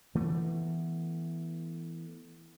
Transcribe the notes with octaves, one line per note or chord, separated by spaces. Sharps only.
E3 A3 B3